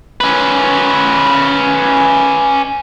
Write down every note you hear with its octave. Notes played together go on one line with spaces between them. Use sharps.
C#4 B4